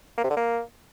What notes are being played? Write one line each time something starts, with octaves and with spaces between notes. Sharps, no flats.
A#3
C3
D3
A#3